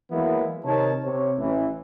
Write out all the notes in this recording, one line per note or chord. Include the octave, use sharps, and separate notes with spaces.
E3 F#3 G#3 A#3 B3 E4
C3 D#3 D#4 A#4 C#5 A5
C3 C#5
A1 E3